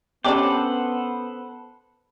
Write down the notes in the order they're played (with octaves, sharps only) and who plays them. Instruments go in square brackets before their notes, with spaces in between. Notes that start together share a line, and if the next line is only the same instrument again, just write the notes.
[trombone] B3 [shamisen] C#4 D4 G4 [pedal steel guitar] A4 B4 C5 [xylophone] D6